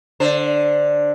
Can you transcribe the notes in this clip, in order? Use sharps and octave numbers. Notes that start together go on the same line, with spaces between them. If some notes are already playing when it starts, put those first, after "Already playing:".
D3 C5